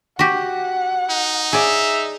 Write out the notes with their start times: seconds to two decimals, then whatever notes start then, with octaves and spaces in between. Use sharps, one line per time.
0.19 F#4 G4 F#5
1.10 D#4
1.53 G#4 D5 E5